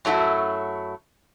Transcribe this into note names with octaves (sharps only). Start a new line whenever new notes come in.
F#2 F#3 A3 E4 F#4